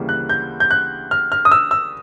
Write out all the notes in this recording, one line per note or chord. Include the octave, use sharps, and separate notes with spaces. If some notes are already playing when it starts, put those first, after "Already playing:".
Already playing: D2 C#3 E3 G3 A#3
F#6
G6
G6
F#6
F6
F6
D#6
E6
E6